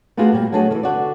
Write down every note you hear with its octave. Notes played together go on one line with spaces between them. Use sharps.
A3 B3 D4 F4 F#4 G#4
A#2 G3
F#3 A3 D4 F#4 G#4
D#3 E3
D3 F#4 D5